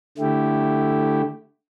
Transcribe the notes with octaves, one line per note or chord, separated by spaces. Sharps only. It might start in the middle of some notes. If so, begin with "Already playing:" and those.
D3 A3 E4 G4